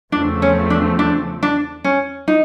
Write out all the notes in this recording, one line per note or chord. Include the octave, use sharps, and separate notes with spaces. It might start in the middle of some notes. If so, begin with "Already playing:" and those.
E2 C#3 F3 A3 C4 D4
C#4
D4
D4
D4
C#4
D#4